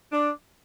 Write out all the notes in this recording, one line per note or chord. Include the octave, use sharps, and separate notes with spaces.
D4